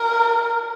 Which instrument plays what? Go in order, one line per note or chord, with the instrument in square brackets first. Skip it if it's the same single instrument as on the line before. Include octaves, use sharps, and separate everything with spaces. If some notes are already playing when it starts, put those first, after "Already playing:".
Already playing: [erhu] A#4